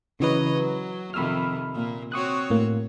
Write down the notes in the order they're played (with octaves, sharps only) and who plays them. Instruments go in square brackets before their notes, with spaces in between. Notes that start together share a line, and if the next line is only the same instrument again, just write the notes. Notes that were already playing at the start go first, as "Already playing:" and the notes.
[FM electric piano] C#3 E3 B4 [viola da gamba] F#3 C#5 D#5
[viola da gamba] F#3
[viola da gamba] F2 C3 D#3 [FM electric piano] B5 E6 F6
[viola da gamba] A#2 A#3
[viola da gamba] C4 F#4 C#5 [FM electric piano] C#6 D#6 F#6
[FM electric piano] A2 A#3